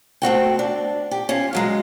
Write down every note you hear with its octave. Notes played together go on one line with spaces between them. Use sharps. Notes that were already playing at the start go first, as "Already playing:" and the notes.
A3 C4 F#4 G5
D4
G4
C#4 F4
C#3 F#3 G#3